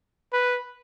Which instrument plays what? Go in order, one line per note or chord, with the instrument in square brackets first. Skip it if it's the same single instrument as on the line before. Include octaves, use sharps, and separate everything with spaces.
[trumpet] B4